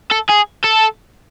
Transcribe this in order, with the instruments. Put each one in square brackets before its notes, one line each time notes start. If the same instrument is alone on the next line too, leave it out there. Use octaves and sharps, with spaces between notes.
[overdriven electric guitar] A4
G#4
A4